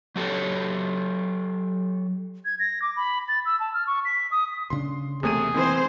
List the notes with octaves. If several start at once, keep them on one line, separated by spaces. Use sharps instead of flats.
F#3 G4 A4 C#5
G#6
A#6
D6
B5
A6
E6
A5
F6
C#6
B6
D#6
D2 C#3 D4 C6
E1 C3 A3 A#3 G#4 D#7
D#3 E3 C4 C5